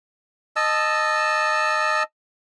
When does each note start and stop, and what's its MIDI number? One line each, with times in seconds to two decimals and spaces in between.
0.56 2.03 75
0.56 2.03 81
0.56 2.03 88